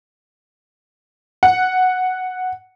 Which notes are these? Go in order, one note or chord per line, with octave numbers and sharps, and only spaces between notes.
F#5